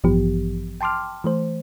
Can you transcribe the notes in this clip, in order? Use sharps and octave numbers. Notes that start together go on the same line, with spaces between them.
A1 G2 E3 F3 B3 G4
G5 A5 C6 D6 F6
E3 A3 C5